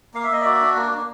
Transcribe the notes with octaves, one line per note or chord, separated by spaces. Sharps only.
A#3 F5
E5
A#3 D#5
F#4 D5 E5
D4
A#3
A#3